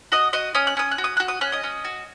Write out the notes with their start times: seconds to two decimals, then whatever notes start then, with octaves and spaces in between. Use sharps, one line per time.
0.12 F#4 D#5 D#6
0.33 F#4 D#5 D#6
0.55 C#4 D#6
0.67 F#6
0.77 C#4 D#6
0.91 F#6
0.98 F#4
1.04 D#6
1.17 F#4 F#6
1.28 D#6
1.41 C#4 F#6
1.52 D#5 D#6
1.63 C#4
1.85 F#4